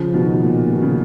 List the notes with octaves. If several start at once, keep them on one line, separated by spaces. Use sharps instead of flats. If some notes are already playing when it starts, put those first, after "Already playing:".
Already playing: C#3 F3
B2 D#3
A#2
B2
C#3